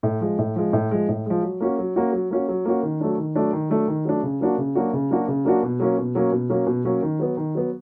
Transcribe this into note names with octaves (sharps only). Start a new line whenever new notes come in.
A2
F3 G#3
A2
F3 G#3
A2
F3 G#3
A2
F3 G#3
F#3
A#3 C#4 F#4
F#3
A#3 C#4 F#4
F#3
A#3 C#4 F#4
F#3
A#3 C#4 F#4
D#3
F#3 A3 D4
D#3
F#3 A3 D4
D#3
F#3 A3 D4
D#3
F#3 A3 D4
C#3
F#3 A#3 D4 F#4
C#3
F#3 A#3 D4 F#4
C#3
F#3 A#3 D4 F#4
C#3
F#3 A#3 D4 F#4
B2
F#3 A#3 C#4
B2
F#3 A#3 C#4
B2
F#3 A#3 C#4
B2
F#3 A#3 C#4
D#3
F#3 B3
D#3
F#3 B3